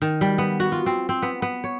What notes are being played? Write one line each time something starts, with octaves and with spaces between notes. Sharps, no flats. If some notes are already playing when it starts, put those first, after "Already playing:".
D#3
G3
B3
F#4
F4
C4
C4
B3
B3
C#5